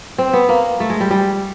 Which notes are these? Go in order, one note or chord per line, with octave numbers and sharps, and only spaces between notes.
C4
B3
A#3
A3
G#3
G3
G3